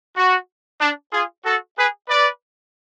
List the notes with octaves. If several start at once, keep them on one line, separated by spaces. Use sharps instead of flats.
F#4
D4
F4 G#4
F#4 A4
G#4 B4
B4 D5